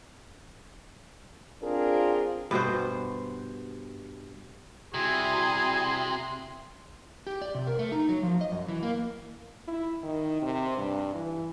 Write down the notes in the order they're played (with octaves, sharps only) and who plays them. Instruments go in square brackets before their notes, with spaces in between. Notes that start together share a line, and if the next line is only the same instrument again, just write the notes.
[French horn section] C4 D4 F4 G#4 A#4
[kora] G2 B2 F#4 C5
[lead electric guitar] C3 [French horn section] G3 E4 F#4 [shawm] G#4 [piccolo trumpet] C6
[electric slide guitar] G4
D5
C3
A#4
A3
D#4
F#3
F3
D#5
F#2
E3
A#3
[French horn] E4
D#3
C3
G2
E3